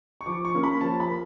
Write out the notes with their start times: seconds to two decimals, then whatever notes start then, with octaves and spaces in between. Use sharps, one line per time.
0.21 C#6
0.26 F3 D6
0.45 C#6
0.54 A#3 C#4
0.63 B5
0.81 F3 A5
1.00 B5
1.09 A#3